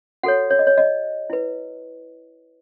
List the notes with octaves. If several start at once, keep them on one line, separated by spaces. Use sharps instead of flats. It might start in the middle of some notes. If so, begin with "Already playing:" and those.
F#4 A4 C#5 F#5
C#5
D#5
C#5
D#5
E4 B4